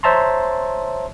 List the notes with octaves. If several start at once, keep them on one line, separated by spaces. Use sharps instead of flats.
C5 C#5 E5 A5 A#5 C6